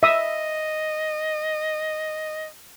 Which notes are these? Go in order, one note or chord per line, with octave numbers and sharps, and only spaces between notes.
D#5 E5 D#6